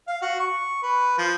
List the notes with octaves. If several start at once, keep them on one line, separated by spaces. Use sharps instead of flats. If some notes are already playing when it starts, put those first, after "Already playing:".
F5
F#4
C#6
B4
F3